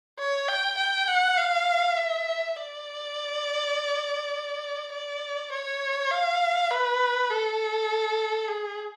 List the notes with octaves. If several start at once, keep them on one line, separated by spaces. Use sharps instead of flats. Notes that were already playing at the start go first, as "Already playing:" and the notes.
C#5
G5
G5
F#5
F5
E5
D5
D5
C#5
F5
B4
A4
G#4